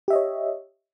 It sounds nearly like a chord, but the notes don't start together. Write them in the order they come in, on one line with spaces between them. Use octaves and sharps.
G4 E5 D#5 C#5